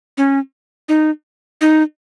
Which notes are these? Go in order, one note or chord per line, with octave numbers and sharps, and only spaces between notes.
C#4
D#4
D#4